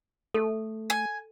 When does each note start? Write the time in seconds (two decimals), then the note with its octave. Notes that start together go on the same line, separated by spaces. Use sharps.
0.34 A3 A4
0.90 G#5